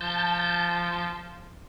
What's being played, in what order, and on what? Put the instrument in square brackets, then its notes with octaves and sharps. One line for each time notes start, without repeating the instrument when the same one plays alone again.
[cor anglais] F3 [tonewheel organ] A5 G6